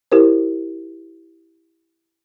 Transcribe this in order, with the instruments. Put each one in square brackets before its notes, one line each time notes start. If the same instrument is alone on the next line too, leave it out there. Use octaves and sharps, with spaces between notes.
[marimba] E4 G4 A#4 C5